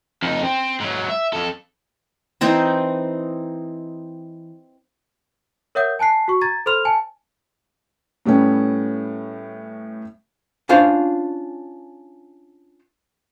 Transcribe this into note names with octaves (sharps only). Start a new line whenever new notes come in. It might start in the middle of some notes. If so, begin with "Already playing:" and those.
F2 D#4
C4
G#2 F#3
E5
F2 A4
E3 C4 D#4 C5
A#4 C#5 E5 F#5 D#6 G6
G#5 A5 F#6 C7
F#4 C#6
A#5 G#6 A6
A4 C5 B5 C6 F6 F7
G#5 A5
A2 G3 A3 B3 C#4
C#4 D4 F4 C5